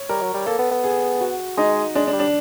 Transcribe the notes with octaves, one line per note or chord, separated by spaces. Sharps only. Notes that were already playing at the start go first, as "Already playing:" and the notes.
Already playing: C#5
G3 A#4
F#3
G3
A#3 A4
B3
B3
G#4
F#4
G#3 D#4
G#3 D4
D4
G3
D4